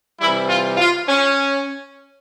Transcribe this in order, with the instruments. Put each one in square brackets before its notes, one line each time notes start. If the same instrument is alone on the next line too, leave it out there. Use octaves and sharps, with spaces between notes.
[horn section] C3 E3 G3 E4
F4
F4
C#4